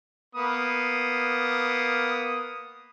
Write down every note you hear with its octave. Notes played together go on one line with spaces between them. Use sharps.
A#3 B3 D#6